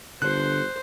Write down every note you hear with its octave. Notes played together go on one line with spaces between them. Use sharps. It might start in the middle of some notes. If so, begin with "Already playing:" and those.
G1 D3 C5 F#6